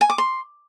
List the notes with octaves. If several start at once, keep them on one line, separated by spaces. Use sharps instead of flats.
G#5
D6
C6